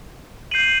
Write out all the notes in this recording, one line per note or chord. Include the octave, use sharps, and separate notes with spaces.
G6 C7 D#7 F#7